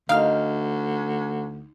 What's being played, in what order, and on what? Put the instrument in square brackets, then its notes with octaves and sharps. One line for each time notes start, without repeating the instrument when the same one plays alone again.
[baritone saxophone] D2 [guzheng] D#4 G5 [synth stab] F5 F6